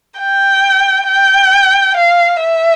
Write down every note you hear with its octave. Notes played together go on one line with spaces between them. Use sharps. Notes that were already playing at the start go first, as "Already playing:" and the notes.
G5
G5
F5
E5